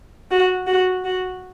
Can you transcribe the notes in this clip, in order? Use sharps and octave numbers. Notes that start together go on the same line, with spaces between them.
F#4
F#4
F#4